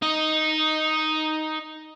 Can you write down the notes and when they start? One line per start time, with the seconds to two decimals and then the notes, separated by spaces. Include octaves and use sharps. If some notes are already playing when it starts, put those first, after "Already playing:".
0.02 D#4 D#5